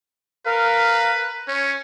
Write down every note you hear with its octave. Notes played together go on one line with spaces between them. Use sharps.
A#4 B4 F5
C#4 C#5